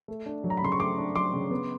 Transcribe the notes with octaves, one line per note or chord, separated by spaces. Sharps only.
A3
D4
F#3
A#5
B5
C#3 C6
C#6
A3 C6 D6
D4
F#3 C6 D6
C#3
B3